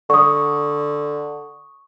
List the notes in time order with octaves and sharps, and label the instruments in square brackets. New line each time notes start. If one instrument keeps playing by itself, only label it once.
[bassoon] D3 [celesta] C#6 D#6